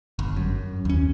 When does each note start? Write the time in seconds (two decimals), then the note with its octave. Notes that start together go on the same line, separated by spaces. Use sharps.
0.19 G1
0.36 F#2
0.85 D#2 C#4